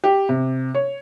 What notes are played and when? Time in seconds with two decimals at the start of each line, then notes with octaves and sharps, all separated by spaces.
0.04 G4
0.29 C3
0.74 C#5